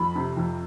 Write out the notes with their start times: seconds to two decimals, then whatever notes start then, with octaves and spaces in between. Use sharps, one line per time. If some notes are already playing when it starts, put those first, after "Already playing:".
Already playing: F2 B5
0.15 C3
0.37 F2